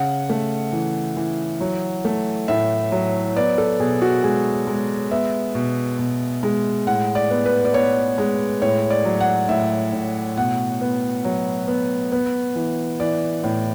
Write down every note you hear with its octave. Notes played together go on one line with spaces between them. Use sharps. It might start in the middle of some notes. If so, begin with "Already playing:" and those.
Already playing: C#3 F#5
A3
E3
E3
F#3
A3
A2 E5
F#3
B3 D5
A4
B2 G#4
F#4
G#3 G#4
G#3
B3 E5
B2
B2
G#3
A2 F#5
D5
B3
B4
D5
B3 C#5
G#3
A2 C#5
D5
F#3
F#5
A2 E5
A2
B2 F#5
B3
F#3
B3
B3
E3
E3 D5
A2